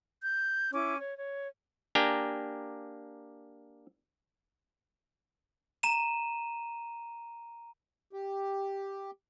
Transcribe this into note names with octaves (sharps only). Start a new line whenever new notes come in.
G6
C#4 E4 D6
C#5
C#5
A#3 D4 G4 G5 G#5 A#5
A#5 D#7 E7
G4